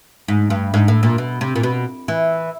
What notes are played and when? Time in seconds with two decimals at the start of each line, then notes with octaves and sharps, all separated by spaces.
0.28 G#2
0.50 G2
0.74 G#2
0.88 A2
1.03 A#2
1.18 B2
1.41 C3
1.56 A#2
1.63 B2
2.08 E3